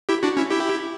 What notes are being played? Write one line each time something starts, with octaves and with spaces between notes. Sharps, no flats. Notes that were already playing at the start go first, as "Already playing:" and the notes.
E4 G4
D4 F#4
C#4 E4
E4 G4